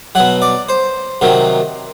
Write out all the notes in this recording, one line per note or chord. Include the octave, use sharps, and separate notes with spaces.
B2 F#3 F#5
D5
C5
C3 D#3 F#3